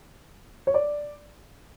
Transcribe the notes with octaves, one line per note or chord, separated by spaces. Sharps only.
C#5
D5